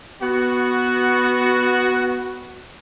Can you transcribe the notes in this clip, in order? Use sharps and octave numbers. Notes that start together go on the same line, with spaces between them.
B3 F#4